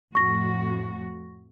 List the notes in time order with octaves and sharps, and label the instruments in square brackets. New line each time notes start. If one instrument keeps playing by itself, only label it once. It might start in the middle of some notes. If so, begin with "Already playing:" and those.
[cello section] F2 A2 F#4 [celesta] C#6 A#6